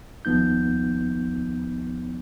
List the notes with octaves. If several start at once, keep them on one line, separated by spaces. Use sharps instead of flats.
D#2 F3 B3 D#4 G6